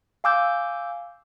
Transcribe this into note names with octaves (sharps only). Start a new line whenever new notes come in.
F5 G#5 D6 E6 G6